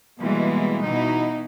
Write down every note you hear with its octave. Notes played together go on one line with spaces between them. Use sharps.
B2 E3 G3 G#3 A#3
B2 E3 D#4 E4